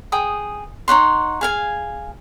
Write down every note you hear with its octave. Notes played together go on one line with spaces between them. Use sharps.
G#4 G5 D#6
D#4 C#5 F#5 C6
G#4 F5 G#5